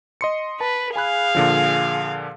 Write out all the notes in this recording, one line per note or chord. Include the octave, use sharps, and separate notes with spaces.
D#5 C6 C#7
B4 A5
G#4 F5 G#5 B5 F#6
A#2 D3 F3